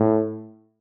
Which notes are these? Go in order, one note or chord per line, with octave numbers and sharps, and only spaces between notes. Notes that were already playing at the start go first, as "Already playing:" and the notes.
Already playing: A2